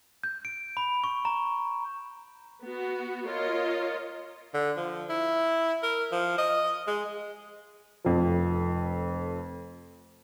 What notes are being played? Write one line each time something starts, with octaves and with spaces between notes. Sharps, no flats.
G6
D7
B5
C#6
A#5
B3 F#4
F4 A#4 C#5 D#5
D3
F3
E4
A#4
F3
D#5
G#3
F1 F2 F3